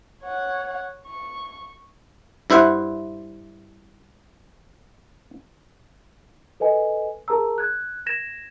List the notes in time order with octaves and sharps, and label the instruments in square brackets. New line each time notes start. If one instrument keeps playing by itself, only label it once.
[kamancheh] C#5 F#5
C#6
[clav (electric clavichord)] G2 E4 C5 E5 F#5
[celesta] A4 B4 D#5 G#5
G#4 A#4 A5 A#5 E6
F#6 G#6
G#6 A#6 E7